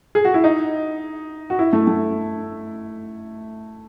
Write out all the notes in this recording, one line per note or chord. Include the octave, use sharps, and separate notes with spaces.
G#4
F#4
E4
D#4
F#4
E4
A3
A3